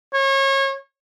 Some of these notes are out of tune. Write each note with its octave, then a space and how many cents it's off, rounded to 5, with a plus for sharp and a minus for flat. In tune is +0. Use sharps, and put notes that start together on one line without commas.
C#5 -30